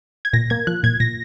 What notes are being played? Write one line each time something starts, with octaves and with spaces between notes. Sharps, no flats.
G#6
A#2 A#6
A#3 G#6
F3 F#6
A#2 G#6
A#2 A#6